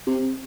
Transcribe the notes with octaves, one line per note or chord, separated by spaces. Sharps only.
C3